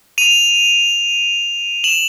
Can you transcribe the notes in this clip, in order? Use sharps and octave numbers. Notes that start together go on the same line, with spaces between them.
D#7 F7
E7 F#7